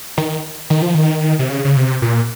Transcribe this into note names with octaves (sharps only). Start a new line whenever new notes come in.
D#3
D#3
F3
D#3
C3
C#3
C#3
C3
A#2